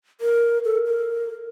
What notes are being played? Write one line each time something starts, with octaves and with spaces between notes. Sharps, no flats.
A#4
A4
A#4